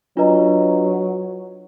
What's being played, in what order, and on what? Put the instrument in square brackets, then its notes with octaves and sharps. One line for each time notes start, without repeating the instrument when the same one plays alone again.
[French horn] F#3 [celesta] D4 F4 B4 D#5 A#5